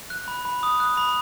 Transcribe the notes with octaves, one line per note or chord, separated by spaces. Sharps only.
F#6
B5
B5
D#6
F#6
B5